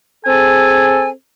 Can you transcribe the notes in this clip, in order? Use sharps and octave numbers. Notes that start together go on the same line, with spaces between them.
C4 G#4 A4 G#5